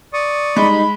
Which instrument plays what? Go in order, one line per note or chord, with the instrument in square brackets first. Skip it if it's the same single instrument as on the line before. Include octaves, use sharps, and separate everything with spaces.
[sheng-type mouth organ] D5 C#6 D#6
[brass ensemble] G3 D#4 [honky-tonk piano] G#3 [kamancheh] B5